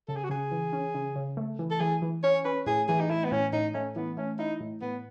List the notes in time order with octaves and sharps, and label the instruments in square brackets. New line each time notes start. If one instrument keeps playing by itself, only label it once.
[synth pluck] C#3 [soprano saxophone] A4
[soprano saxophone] G#4
F#4
[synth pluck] C#3 [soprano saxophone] G#4
[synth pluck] E3
C#4
C#3
C#3
A3
E3
[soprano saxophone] A4
[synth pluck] E3 [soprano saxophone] G#4
[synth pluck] E3
[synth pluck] C#4 [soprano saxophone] C#5
[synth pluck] C#4 [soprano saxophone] B4
[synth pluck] A2 [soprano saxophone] G#4
[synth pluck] E3 [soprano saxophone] G#4
[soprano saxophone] D#4
[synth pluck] A3 [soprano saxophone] E4
[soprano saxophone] B3
[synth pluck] A2 [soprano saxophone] C#4
[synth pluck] A2 [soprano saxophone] D#4
[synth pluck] A3 [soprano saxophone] C#4
[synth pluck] E3 [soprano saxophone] B3
[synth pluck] A3 [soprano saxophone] C#4
[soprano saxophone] D#4 [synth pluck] E4
[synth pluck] A2
[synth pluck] A2 [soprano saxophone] B3